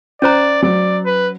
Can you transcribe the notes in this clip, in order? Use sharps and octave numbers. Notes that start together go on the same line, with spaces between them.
C#4 C5 D5 A#5
F#3 D5
B4